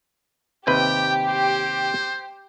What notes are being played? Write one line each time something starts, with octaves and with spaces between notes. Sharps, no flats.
D#2 C3 G4 B4 G5
C5